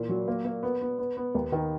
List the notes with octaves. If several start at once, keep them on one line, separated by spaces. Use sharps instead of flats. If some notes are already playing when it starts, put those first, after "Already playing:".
Already playing: A#2 E3
F#3
A#3
A#3
B3
B3
B3
B3
D#2
D#3